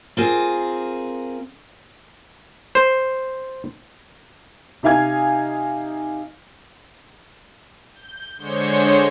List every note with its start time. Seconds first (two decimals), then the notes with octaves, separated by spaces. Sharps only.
0.17 C4 F4 G#4 A#4
2.75 C5
4.83 C3 D#4 F5 G#5 G#6
7.93 G6
8.37 D3 G#3 C5 C#5 G6 C#7